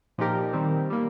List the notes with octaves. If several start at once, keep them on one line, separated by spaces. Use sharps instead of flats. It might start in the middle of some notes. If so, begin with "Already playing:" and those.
A#2 F3 D#4 G4 A#4
D#3 G3 C4
G3 A#3